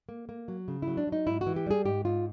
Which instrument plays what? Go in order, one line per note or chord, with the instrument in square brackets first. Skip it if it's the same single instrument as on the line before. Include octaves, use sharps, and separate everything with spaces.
[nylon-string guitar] A#3
A#3
F#3
C#3
F#3 E4
D4
F#3
D#4
G#2 E4
F#4
E3
G4
G3 G#4
G#2 G4
G#2 F4